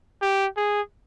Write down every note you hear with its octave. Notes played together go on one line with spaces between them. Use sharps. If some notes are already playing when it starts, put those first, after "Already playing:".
G4
G#4